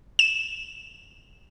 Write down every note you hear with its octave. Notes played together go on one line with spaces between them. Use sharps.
E7